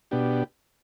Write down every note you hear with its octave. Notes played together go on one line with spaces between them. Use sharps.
B2 B3 D4 G4